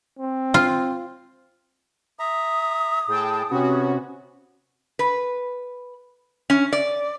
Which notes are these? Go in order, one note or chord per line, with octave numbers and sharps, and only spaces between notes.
C4
F4
E5 A#5 D#6
A2 G#4 G5 A5
C3 B3 C#4 F#4
B4
C#4
D5